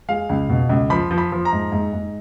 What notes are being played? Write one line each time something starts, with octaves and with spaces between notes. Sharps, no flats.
G#3 F5
C#2
B2
C#2
F3 B5
F3
B5
F3
A#5
G#2
G#2
G#2